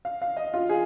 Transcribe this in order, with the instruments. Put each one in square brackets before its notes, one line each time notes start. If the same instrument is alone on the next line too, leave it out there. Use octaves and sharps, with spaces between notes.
[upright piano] F5
F5
D#5
F4
G#4